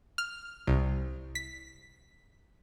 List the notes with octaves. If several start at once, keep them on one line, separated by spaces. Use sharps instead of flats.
F6
C2
B6